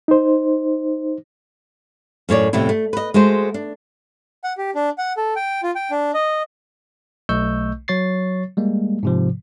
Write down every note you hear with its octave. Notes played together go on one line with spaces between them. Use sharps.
D#4 C5
F#2 A2 C#5 D5
F2 A2 C3 B3 E4
A3
B4 D#5
G#3 A3 F#4 C5
D4
F#5
G4
D4
F#5
A4
G5
F4
G5
D4
D#5
B1 A3 D#5 C#6 E6 G6
F#3 C#5 C#6 A6 C7
G3 G#3 A#3
G#2 C3 F3